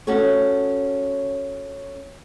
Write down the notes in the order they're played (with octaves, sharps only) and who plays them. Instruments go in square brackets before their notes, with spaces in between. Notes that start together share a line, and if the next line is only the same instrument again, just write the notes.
[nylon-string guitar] C#4 F#4 A4 C#5